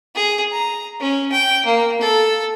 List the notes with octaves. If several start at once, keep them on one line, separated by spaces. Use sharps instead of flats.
G#4
A#5
C#4
G5
A#3
A4